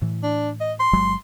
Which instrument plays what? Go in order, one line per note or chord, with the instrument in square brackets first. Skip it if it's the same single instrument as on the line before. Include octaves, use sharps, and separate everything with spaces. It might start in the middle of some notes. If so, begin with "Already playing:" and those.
[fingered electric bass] A2 E3
[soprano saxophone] D4
D#5
C6
[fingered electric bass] G1 F#3 G#3